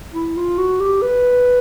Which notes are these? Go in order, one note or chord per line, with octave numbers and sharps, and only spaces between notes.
E4
F4
F#4
G4
B4